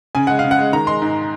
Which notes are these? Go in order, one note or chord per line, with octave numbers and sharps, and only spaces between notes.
C#3 G#5
G#3 F#5
C#3 F5
F#5
G#3
D#3 A#5
G#3 C6
G#2